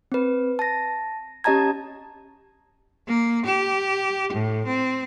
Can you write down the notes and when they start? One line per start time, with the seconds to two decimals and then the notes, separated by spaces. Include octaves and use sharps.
0.12 C4 B4
0.59 A5 A#6
1.44 C#4 G4 D#5 A5 A#5 G#6
3.08 A#3
3.46 G4
4.33 A2
4.67 C4